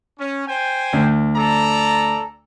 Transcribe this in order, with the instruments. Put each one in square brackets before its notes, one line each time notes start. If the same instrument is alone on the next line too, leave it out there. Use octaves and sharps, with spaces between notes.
[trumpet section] C#4
C5 G5 G#5
[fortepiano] D2
[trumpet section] A4 D5 A#5